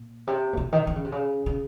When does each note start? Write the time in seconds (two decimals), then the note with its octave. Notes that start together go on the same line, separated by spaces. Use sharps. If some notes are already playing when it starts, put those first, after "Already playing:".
Already playing: A#2
0.27 C3
0.53 A#2
0.57 C3
0.72 D#3
0.87 D#3
0.96 C#3
1.05 C3
1.12 C#3
1.46 C#3